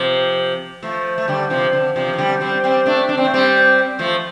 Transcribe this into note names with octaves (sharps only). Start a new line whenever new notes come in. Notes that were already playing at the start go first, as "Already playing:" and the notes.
Already playing: C3 F3
F3 A3
A3
D3 G3
C3 F3
D3
C3 F3
F3
D3 G3
G3 C4
G3 C4
A3 D4
D4
C4
A3
G3 C4
F3 A3